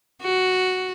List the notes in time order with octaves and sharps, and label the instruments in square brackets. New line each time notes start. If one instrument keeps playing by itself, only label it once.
[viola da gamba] F#4